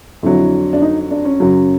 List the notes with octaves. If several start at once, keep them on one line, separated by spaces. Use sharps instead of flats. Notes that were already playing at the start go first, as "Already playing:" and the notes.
F2 D3 F#3 E4
D4
D#4
D4
C#4
F#2 C#3 F#3